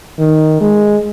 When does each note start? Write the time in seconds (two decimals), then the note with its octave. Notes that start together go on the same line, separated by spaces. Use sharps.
0.19 D#3
0.60 G#3